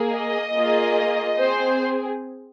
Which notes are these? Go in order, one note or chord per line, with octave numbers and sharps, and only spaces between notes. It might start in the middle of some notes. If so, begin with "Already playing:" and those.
Already playing: A#3 G#4
D#5
A#3 F4 G#4
C4 G#4 C5